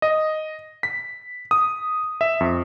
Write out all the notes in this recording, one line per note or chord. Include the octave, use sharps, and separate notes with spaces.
D#5
B6
D#6
E5
F2